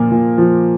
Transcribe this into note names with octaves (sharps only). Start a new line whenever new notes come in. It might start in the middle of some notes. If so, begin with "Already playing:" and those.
Already playing: A#2 F3 A#3
A#2
F3